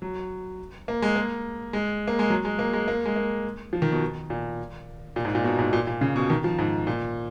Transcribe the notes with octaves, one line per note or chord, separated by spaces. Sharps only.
F#3
A#3
G#3
A#3
G#3
A#3
G#3
F#3
G#3
A#3
G#3
A#3
G#3
A#3
F3
D#3
B2
A#2
A#2
G#2
A#2
B2
G#2
A#2
A#2
C#3
B2
D#3
F3
G#2
A#2